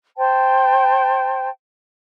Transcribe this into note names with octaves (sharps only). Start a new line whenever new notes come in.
C5 G5 A5